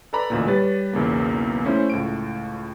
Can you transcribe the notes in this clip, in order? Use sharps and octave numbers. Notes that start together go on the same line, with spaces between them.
A4 B4 D5 A#5 B5
A1 D2 A#2
G3 B4 C#5 A6
B1 E2 C#3 A#3
A3 C#4 E4 C5
C#2 A2 D7